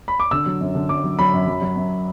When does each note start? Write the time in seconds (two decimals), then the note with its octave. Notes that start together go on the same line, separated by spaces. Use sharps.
0.08 B5
0.20 D6
0.31 D3 E6
0.46 F#3
0.61 F#2
0.75 D3
0.89 F#2 D6
1.04 F#3
1.19 F#3 B5
1.33 F#2
1.47 F#3
1.61 F#3
1.76 F#2